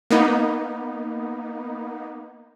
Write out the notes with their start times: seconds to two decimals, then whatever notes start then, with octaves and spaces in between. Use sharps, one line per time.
0.10 A#3 B3 D#4